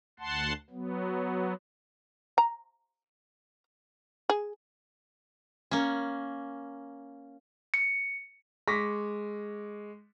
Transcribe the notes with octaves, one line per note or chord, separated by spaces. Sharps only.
D2 F#5 A5 C6
F#3 B3
A#5
G#4
A#3 C#4
C#7
G#3 C#6 D6 A#6 B6